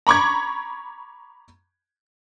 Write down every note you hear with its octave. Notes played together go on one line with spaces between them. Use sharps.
A#5 B5 C#6 D6 G#6